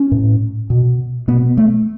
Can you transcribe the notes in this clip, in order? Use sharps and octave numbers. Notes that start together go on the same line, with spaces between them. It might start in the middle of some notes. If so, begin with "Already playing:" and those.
Already playing: C#4
A2
B2
B2 B3
A3